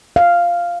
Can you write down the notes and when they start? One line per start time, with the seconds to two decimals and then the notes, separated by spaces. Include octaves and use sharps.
0.16 F5